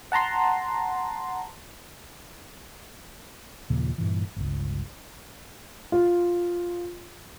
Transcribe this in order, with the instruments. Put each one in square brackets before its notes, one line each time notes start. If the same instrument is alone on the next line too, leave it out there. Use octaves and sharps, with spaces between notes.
[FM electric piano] F#5 A5 A#5 C6
[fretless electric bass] D#2 A#2 C#3 F3
G2 A#2 E3
G1 C#2
[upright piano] F4